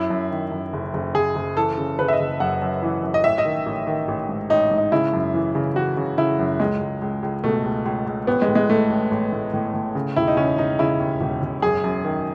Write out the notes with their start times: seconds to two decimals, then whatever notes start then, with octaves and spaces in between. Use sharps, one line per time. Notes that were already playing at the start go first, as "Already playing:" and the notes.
Already playing: F#2 E4
0.10 F#2
0.31 D#3
0.52 F#2
0.73 F#1
0.94 F#1
1.15 F#1 G#4
1.35 F#1
1.56 E3 A4
1.78 C#3
1.99 C#3 B4
2.08 E5
2.13 D#5
2.20 F#1
2.40 F#2 F#5
2.62 F#2
2.83 E3
3.03 F#2
3.14 D#5
3.24 A1 E5
3.38 D#5
3.45 D#3
3.66 A1
3.87 D#3
4.08 A1
4.29 G#2
4.50 A1 D#4
4.71 G#2
4.78 D#4
4.92 C#3 E4
5.13 F#2
5.34 E3
5.55 C#3
5.76 E3 F#4
5.97 C#3
6.18 C#3 E4
6.39 F#2
6.60 C#2 G#3
6.81 C#2
7.02 C#2
7.23 C#2
7.44 B2 A3
7.65 C#2
7.86 C#2
8.06 C#2
8.27 A1 B3
8.42 G#3
8.48 A2
8.55 G#3
8.69 A2 A3
8.90 A1
9.11 A1
9.32 A2
9.54 A2
9.74 A2
9.95 C#3
10.16 E1 E4
10.27 D#4
10.37 C#3 C#4
10.58 E1 D#4
10.79 C#3 E4
11.00 D#2
11.21 E1
11.42 E1
11.62 F#2 G#4
11.84 F#2
12.04 D#3